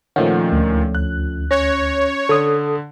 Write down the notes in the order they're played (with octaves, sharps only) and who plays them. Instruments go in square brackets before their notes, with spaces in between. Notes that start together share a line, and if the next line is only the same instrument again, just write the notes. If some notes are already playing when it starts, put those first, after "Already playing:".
[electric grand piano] A#2 D#3 [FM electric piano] F3 A3 C#4 [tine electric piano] F#5
[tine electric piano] D2
[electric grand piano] F#6
[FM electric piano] C#4 [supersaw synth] C#5 [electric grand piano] F#6 A#6
[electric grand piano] D3 [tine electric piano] A4 D#6